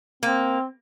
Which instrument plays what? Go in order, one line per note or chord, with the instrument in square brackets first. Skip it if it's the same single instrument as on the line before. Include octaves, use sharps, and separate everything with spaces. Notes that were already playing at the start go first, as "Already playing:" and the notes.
[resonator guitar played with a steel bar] A#3 [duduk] C4